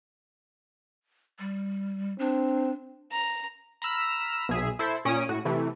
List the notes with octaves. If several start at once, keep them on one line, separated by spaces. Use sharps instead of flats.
G3
C4 D4
A#5
A#5 B5 E6 F6
B1 G#4 E5
E4 A4 C5
A#2 C#4 D#6 D7
A2 F#4
C3 E3 A3